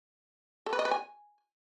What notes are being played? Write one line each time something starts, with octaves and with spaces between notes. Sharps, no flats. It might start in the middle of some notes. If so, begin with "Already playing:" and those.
A4
B4
D#5
B4
G#5